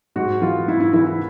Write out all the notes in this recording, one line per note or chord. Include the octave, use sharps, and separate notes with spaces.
G#2 F#4
E3 F4
G#2 E4
E4
E3 E4
E4